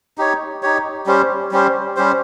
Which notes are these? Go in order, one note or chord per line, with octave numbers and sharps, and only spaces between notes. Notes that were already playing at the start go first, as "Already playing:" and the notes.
D#4 G4 C#5
D#4 G4 C#5
G3 C#4 G4 C5
G3 C#4 G4 C5
G3 C#4 G4 C5